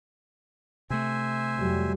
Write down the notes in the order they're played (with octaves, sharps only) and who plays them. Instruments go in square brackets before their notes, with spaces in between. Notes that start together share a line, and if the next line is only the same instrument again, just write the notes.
[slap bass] C3 A3 [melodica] C5 E5 G#5
[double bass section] F2 F#3 G3